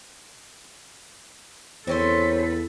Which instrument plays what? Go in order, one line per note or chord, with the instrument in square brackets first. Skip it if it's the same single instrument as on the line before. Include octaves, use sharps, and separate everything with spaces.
[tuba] E2 [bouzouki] C4 C#4 C5 [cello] A4 B4